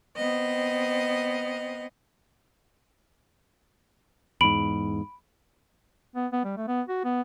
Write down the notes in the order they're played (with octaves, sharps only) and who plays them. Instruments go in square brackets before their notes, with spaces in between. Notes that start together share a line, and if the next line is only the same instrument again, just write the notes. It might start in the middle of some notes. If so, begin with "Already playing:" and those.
[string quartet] B3 C4 D#5
[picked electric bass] E2 G#2 [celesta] B5 D7 F#7
[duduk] B3
B3
G3
A3
B3
F#4
B3